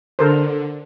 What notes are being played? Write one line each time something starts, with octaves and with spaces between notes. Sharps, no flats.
D3 A4 A#4 C5